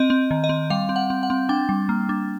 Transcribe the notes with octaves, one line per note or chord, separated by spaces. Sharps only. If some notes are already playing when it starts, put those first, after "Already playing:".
Already playing: C4 D#5
C4
D#3
D#5
C4
G3 F5
C4
F#5
C4
F#5
C4
D4 G5
G3
A#3
D4